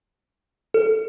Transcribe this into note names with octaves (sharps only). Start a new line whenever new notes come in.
A4